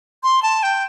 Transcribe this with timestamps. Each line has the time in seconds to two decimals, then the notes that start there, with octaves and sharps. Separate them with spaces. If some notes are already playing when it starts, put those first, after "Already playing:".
0.23 C6
0.43 A5
0.63 G5